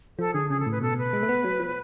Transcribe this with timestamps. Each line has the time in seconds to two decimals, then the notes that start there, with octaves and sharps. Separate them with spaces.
0.19 F3 A4
0.34 D3 G#4
0.50 C#3 G#4
0.60 A4
0.66 A2 B4
0.81 B2 A4
0.98 B4
1.13 G#3
1.23 A3
1.29 B3
1.44 F#3
1.60 F3